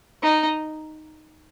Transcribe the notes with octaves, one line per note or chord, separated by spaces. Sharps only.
D#4